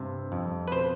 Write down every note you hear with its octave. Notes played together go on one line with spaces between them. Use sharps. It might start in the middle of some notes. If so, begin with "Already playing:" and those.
Already playing: G2 C3
F2
B4
B2 C5